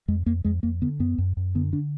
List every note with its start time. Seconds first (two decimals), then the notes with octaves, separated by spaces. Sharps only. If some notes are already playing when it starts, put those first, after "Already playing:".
0.08 F2 G#3
0.26 F2 A#3
0.44 F2 G#3
0.63 F2 A#3
0.82 D3 B3
1.00 F#2 B3
1.18 F#2
1.37 F#2
1.55 D3 B3
1.73 D3 D4